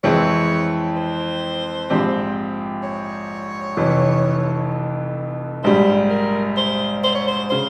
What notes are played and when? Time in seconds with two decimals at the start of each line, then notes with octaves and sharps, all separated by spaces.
0.04 F2 E3 G#3 C4 E4 C#5
0.96 C5
1.90 A#1 G#2 F3 C4 G4
2.83 C#5
3.77 F1 F2 E3
5.64 A#1 G#2 G3 C5
6.10 A#4
6.57 C5
7.04 C5
7.15 C#5
7.28 C5
7.50 C#3 C5